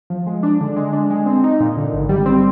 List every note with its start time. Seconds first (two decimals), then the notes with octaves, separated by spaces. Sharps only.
0.10 F3
0.27 G#3
0.43 D4
0.61 D3
0.76 G#3
0.93 D4
1.10 G#3
1.26 C4
1.44 D#4
1.60 A#2
1.77 D3
1.93 G#1
2.09 G3
2.26 C4